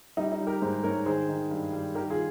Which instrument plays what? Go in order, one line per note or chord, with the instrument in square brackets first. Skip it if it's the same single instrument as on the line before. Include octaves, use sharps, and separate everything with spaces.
[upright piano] G3 D#4
D#4
G3
G4 A#4
G#2 G#4 C5
G#2 A#4 C#5
D#3 G#4 C5
D#3
G2
G3
D#3 G4 A#4
F4 G#4